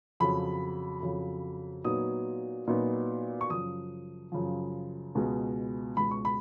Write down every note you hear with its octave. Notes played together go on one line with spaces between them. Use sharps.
F2 C#3 F#3 B5
F2 C#3 F#3
A#2 F#3 B3 D#4 D#6
A#2 F#3 B3 D#4
C#6
F#2 C#3 F3 D#6
F#2 C#3 F3
C#2 B2 G#3
C#2 B2 G#3 B5
C#6
B5